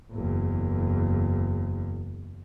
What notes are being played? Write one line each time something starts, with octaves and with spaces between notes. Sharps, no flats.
F#1 E2